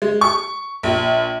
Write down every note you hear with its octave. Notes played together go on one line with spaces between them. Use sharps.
G#3
C#6
A#1